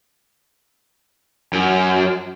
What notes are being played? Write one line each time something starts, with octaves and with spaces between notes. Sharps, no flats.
F#2